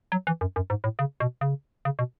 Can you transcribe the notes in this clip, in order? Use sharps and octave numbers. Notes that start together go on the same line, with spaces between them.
F#3
E3
F#2
F#2
G#2
A2
C#3
B2
C#3
C#3
B2